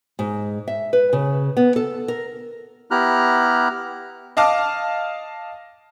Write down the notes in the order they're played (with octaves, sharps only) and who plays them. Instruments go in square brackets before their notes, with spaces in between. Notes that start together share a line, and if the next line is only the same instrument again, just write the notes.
[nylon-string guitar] G#2
E5
B4
C#3
B3
A4
A#4
[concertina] B3 E4 G4 A#5 F6 F#6
[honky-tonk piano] D#5 F5 A5 D6 F6